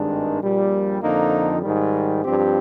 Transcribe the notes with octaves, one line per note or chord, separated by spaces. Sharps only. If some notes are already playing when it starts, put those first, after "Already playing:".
Already playing: G#1 G2 D#3 G#3 D4
A#1 A#2 G3
F2 D3 F3 A#3 D#4
G#2 D#3 G3
G2 F3 C4 G4